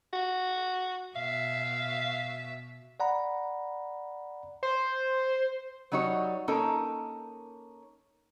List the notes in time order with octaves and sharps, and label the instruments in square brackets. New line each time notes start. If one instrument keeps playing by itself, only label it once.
[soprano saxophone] F#4
[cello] B2 E5 [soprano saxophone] F5
[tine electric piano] D5 F#5 A#5 B5
[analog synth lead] C5
[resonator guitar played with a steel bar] F#3 G3 D#4 F#4 C#5
A#3 C#4 D#4 A4 A#4